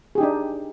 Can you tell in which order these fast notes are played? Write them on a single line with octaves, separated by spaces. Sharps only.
G#4 G4 D#4 D4